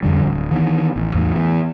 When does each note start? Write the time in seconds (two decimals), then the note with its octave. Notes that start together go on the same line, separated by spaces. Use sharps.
0.03 F2 D3 G3
0.25 D1
0.51 D#3 E3 A3 B3
0.96 A1
1.14 E2 A2
1.32 E3 B3